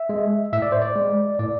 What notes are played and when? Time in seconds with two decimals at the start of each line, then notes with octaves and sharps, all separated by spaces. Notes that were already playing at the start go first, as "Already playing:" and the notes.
Already playing: E5
0.09 G#3
0.53 A2 E5
0.62 D5
0.72 C5
0.82 D5
0.96 G#3
1.39 A2 D5